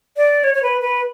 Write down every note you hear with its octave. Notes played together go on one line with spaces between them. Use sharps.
D5
C#5
C#5
B4
B4